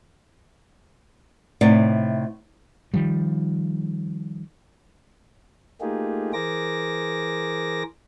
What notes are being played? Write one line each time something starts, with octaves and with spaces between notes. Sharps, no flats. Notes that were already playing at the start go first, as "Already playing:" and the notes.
A2 C3 D#4 D5 F#5
D#3 F3 G3
A3 A#3 D#4 F4 G4 G#4
E3 G#4 A#4 C5 D6 A#6